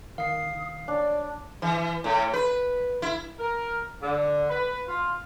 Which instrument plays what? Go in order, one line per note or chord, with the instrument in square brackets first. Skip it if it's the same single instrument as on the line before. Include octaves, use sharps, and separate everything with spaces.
[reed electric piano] D#3 A#4 [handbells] F5 C7 [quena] D#6
[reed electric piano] C2 D#3
[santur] D4 [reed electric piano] C#5 [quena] D5
[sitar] E3
A2
B4
E4
[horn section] A#4
D3
B4
F4